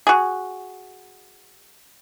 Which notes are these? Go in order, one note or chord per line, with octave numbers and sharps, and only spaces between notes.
F#4 G#4